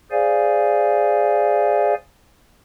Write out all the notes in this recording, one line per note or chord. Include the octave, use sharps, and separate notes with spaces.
G#4 C5 D5 F5 G#5